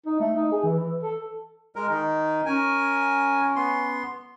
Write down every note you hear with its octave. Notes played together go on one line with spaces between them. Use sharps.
D#4
A3
D#4
G#4
E3
A4
G#3 A#4
D#3 D#4
C#4 A#4 G#5
B3 C6